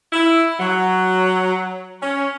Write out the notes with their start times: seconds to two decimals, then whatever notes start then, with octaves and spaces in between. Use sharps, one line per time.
0.13 E4
0.60 F#3
2.02 C#4